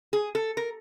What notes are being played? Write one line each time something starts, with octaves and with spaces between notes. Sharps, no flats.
G#4
A4
A#4